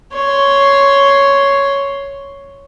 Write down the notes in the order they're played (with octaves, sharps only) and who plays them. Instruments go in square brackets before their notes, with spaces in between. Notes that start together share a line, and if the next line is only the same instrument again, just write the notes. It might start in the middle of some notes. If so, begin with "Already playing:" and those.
[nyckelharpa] C#5 C6